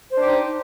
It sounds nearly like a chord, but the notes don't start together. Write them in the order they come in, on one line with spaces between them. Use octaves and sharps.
C5 D4 G4 D#4